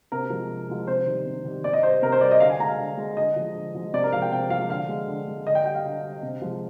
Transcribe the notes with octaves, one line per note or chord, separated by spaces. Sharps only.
C3 A#4
F3 G#3
C3
F3 G#3
C3 C5
D#3 G3
C3
D#3 G3
C3 D5
D#5
G3 C5
C3 A#4
C5
G3 D5
D#5
D3 F5
G#5
G#3 A#5
F5
D3
G#3
D3 D#5
F3 G#3
D3
F3 G#3
C3 D5
A#4
F3 G#3 F5
G5
C3 G5
F3 G#3 F5
D3 F5
G#3
D3
G#3
D3 D#5
G5
G3 G5
F5
D3
G3
C3
F3 G#3